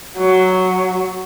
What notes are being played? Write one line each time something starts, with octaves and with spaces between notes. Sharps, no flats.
F#3